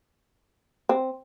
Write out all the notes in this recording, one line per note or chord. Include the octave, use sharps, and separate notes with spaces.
C4